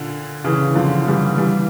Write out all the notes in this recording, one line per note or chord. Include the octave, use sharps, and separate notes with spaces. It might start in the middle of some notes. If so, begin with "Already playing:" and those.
Already playing: A#2 D3
C#3 E3
D3 F3
E3 G3
E3 G3